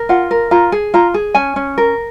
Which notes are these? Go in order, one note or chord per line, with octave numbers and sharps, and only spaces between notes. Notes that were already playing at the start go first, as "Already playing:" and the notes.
Already playing: A#4
F4 F#5
A#4
F4 A#5
G#4
F4 A#5
G#4
C#4 G#5
C#4
A#4